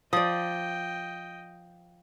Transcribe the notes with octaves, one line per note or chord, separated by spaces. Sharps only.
F3 D5 D#5 G5 D#6